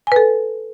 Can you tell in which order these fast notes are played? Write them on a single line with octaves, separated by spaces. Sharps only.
G#5 B4 A4